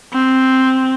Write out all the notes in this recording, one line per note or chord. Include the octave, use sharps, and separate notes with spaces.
C4